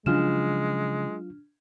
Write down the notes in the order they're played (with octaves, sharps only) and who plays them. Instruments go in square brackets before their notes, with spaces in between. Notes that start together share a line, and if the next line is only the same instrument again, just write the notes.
[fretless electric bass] C#3 F3 [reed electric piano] F#3 F4 [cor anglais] G#3 [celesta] D4 F6 E7